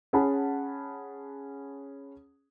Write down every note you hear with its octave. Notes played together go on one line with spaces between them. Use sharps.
C#4 G#4 F#5 A5 B5